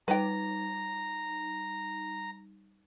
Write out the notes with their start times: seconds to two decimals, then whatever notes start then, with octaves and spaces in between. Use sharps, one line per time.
0.08 G3 D#4 B4 G5 A#5